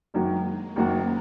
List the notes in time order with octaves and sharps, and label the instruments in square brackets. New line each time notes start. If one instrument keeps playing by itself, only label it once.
[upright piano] F#1 F#2 D#3 A#3 F#4 [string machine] G#3
[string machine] A#3
[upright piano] F#1 F#2 D#3 A#3 F#4 [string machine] C#4